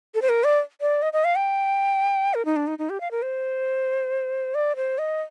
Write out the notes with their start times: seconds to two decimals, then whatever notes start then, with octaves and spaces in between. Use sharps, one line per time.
0.15 A4
0.22 C5
0.29 A#4
0.44 D5
0.81 D5
1.02 D#5
1.13 D#5
1.24 F5
1.36 G5
2.34 A#4
2.45 D#4
2.56 D4
2.67 D#4
2.79 D#4
2.90 G4
3.01 F5
3.11 A#4
3.22 C5
4.55 D5
4.76 C5
4.98 D#5